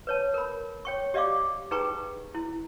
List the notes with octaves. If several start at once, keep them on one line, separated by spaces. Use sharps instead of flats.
B4 C#5 A5
A#4 B5
C#5 G5 C#6
G4 D5 D#5 F5 C#6 D6
D#4 G#4 B4 G5 A#5 C#6
E4